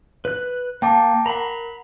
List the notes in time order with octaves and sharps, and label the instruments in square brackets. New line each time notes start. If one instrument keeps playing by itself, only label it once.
[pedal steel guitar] B4 F#6
[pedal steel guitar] A#3 [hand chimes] G5 A5 D6
[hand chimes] A#4 F#5 [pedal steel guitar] A#5 B5